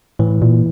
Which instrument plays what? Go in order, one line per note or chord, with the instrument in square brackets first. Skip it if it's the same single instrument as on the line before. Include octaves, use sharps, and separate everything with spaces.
[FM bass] A2 [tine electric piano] E3
[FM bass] A#2